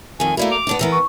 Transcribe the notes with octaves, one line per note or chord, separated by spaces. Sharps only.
F2 D#3 G#5
A3 A#3 E4 F#4 A#4 D5 F5
D6 F7
B3 D4 D#4
E2 E3 B3 A#4
C#6